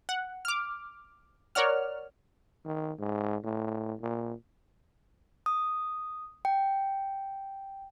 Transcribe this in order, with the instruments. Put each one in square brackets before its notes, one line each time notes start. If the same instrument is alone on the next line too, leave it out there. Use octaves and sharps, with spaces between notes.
[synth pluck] F#5
D6 F6
A#4 C#5 D5 F#5 F6
[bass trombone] D#3
G#2
A2
A#2
[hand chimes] D#6
G5